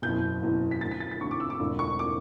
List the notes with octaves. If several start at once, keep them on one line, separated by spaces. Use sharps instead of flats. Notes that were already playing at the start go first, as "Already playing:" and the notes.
F#1 E2 B2 G6
F#1 E2 B2
B6
D2 D3 A6
B6
A6
A6
D2 D3 C#6
D6
E6
D6
E1 D2 D3
C#6
D3 D6